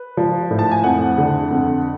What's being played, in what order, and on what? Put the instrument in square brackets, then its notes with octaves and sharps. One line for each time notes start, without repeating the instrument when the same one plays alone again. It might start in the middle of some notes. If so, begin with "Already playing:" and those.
Already playing: [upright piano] B4
F3
A2
A5
G#5
F2 F#5
D3
F2